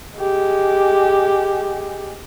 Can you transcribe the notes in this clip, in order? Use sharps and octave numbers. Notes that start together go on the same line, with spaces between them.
G#3 G4